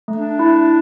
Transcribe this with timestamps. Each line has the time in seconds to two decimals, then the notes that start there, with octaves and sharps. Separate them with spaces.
0.08 A3
0.16 D4
0.39 E4